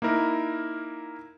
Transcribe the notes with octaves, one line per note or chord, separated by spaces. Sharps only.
A#3 D#4 E4 A#4